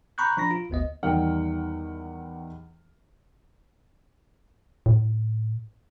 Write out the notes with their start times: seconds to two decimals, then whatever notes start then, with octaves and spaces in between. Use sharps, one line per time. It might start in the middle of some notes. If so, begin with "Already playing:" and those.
0.18 A#5 B5 C#6 F#6 G6
0.37 F3 D4 A#5 B5 A#6
0.51 F4
0.70 G#1 D2 B3 D#5
1.03 E2 D#3 G3 F#5 G5 F6
4.86 A2